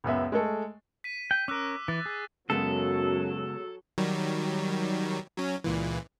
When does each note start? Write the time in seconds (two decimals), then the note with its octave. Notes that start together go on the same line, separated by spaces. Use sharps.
0.04 C#2 F#2 B3 E5
0.32 G#3 A3 A4
1.04 B6 D#7
1.31 G5
1.48 C#4 A#4 D6 E6 F#6
1.88 E3 A6
2.06 G#4
2.50 F#2 C#3 F#3 G#3 B3 A4
3.98 D#3 F#3 G3
5.37 F#3 C#4
5.64 C#2 A#2 E3